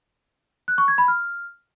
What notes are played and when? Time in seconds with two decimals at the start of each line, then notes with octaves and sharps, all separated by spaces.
0.68 F#6
0.78 C#6
0.88 G#6
0.98 B5
1.08 F6